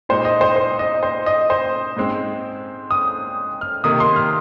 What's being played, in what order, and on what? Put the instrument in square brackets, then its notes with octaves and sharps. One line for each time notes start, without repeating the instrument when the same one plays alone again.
[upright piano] A#2 G#3 D#4 C5
D#5
C5
C5
D#5
C5
D#5
C5
G#2 G#3 C4
D#6
F6
C3 D#3 A#3 D#6
C6
F6